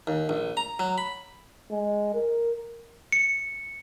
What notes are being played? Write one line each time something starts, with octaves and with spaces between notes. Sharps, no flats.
D#2
A#1
A#5
F#3
B5
G#3
A#4
C#7